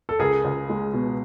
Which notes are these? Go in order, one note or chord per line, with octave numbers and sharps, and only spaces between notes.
A4
C#2 G#4 A#4
C#2
G#3
B2